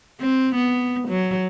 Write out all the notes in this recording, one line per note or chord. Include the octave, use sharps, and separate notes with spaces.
C4
B3
F#3